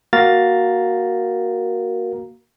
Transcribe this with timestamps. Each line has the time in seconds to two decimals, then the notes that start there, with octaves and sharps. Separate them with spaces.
0.13 A#3 F#4 A#4 F5 A#5 A6